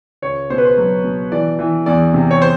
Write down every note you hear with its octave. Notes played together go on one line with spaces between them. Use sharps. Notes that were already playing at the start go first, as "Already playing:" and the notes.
C#2 C#5
B2 C5
B4
C5
F#3
B2
E3 D5
E3
E2 D5
C3
C#5
C5